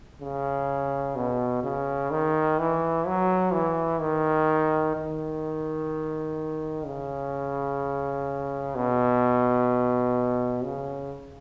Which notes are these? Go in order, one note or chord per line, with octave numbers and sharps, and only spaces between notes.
C#3
B2
C#3
D#3
E3
F#3
E3
D#3
D#3
C#3
B2
C#3